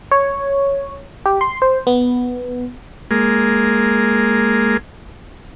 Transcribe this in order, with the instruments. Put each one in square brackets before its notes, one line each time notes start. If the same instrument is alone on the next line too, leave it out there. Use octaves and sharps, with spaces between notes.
[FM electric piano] C#5
G4
C6
C5
B3
[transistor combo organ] G#3 A#3